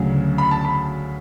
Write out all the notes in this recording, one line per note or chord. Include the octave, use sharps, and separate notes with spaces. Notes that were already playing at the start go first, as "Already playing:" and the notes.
Already playing: D2 C#3 F#3
B5
A5
B5